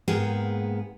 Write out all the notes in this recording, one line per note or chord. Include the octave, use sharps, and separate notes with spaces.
G#2 A#3 B3 G#4 G5